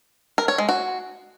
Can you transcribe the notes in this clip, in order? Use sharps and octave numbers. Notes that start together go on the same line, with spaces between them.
A#4
C#5
G#3
F#4